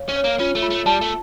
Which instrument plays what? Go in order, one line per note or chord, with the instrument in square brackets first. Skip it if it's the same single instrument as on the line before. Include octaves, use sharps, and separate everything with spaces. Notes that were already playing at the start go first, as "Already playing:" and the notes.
Already playing: [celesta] C#5 F5
[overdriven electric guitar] C#4
[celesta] C#5
[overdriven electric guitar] A#3
[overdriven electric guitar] C#4 [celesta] F4
[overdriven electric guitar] A3
[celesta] F4
[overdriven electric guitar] A3
[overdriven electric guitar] G3 [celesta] A5
[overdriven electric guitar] A3